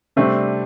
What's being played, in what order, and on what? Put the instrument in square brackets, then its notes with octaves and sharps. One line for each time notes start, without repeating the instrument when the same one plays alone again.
[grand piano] C3 G3 D4 [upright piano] A3 C4